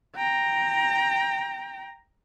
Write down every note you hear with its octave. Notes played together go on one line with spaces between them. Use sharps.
G5 A#5